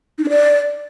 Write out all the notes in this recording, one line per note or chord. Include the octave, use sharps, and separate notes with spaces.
D#4
D4
D5